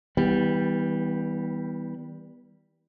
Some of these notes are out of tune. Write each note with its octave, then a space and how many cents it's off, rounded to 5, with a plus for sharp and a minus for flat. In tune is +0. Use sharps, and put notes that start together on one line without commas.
E3 -45 G3 +0 B3 +0